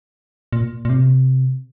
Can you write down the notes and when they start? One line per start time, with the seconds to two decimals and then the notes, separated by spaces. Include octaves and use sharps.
0.53 A#2
0.85 A#2
0.90 C3